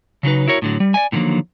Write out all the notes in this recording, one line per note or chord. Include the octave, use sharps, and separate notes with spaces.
C#3 F#3 D#4 B4
E4 F#4 A#4 C#5
A2 D3 F#3
G3
D5 D#5 G#5
A2 D3 D#3 F3 F#3 A#3